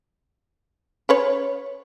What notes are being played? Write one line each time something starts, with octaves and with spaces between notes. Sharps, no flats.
C#4 B4 C#5